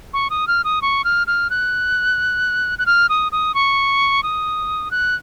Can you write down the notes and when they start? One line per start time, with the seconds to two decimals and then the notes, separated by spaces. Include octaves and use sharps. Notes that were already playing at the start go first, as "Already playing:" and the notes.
0.13 C#6
0.30 D#6
0.48 F6
0.64 D#6
0.82 C#6
1.04 F6
1.27 F6
1.50 F#6
2.79 F#6
2.86 F6
3.09 D#6
3.32 D#6
3.54 C#6
4.23 D#6
4.91 F#6